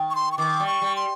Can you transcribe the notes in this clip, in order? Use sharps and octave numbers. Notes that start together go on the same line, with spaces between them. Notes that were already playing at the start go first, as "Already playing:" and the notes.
Already playing: D#3
C#6
C6
C#6
D#3 D6
G3
C#6
G3
C6